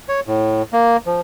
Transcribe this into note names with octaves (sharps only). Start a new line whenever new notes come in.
C#5
A2
A#3
F3